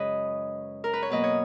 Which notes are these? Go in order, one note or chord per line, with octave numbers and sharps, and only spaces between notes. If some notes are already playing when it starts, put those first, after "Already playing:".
Already playing: F#2 C#3 G#3 B4 C#5 D#5
A#4
B4
C#5
B2 F#3 A#3 B4 D#5
C#5